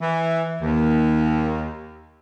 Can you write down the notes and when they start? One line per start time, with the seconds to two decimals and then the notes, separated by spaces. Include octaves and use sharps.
0.01 E3
0.62 D#2